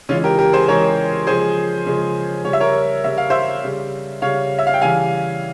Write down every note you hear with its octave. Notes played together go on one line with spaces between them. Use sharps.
C#3 E3 G#3 C#4 F4
G4 A#4
G4 A#4
G#4 C5
C#3 E3 G#3 A#4 C#5
C#3 F3 G#3 G#4 C5
C#3 F3 G#3
C#3 G3 C#5
E5
A#4 C#5
C#3 G3 E5
F5
C5 E5
C#3 G3
C#3 G3 C#5 F5
E5
F5
G5
C#3 E3 G3 F5 G#5